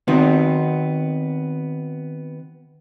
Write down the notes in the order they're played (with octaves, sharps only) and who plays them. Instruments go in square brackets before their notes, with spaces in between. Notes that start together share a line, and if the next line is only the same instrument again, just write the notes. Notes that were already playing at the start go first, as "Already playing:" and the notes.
[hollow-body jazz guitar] D#3 B3 C4 D#4 F#4